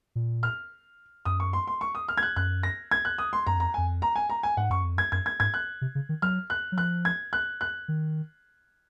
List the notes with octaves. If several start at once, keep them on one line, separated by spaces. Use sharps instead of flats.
A#2
F6
F#2 D#6
C#6
C6
C6
C#6
D#6
F6
G#6
F#6
F#2 F#6
A#6
G#6
F#6
D#6
C6
F#2 A#5
F2 A#5
F2 G#5
A#5
G#5
A#5
G#5
G#2 F#5
F#2 C#6
F2
F#2 G#6
F#2 G#6
G#6
G#2 G#6
F#6
C3
C#3
D#3
F#3 F6
F#6
F#3
F3 F#6
G#6
F#6
F#6
D#3